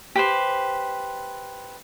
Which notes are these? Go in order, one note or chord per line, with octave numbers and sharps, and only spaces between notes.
G4 B4 C5